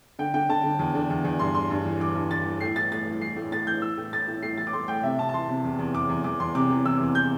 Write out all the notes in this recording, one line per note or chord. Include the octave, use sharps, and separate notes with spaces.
D3 G5
D3 G5
D3 A5
D3
E2
D3
E2
E2
G2 C6
E3 C6
G2
E3
E3 D6
G2
E3 A6
E3
A2 C7
E3 A6
A2 A6
E3
E3 C7
A2
A2 A6
E3 G6
E3 E6
A2
A2 A6
A2
A2 C7
E3 A6
D6
A2 C6
A2 G5
C3 E5
C3 A5
A5
E3 C6
C3
E2
E2
E2 D6
E2
E2 D6
E2 C6
C3 D6
E3
E3 E6
E2
E3 G6